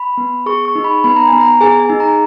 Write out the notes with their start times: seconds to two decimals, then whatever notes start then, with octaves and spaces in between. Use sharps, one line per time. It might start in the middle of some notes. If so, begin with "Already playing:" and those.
Already playing: B5
0.17 B3
0.46 G#4 C#6
0.65 C#6
0.75 D#4
0.84 B5
1.04 B3 B5
1.16 A#5
1.28 B3 G#5
1.40 A#5
1.61 G#4 G#5
1.80 G#5
1.90 D#4
2.00 A#5